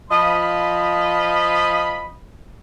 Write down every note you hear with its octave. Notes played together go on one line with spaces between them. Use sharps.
F3 D#5 B5